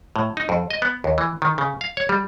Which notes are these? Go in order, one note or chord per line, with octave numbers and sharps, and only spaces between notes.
A2
D#4
F2
D#5
B3
D#2
E3
D#3
C#3
F5
C#5
G3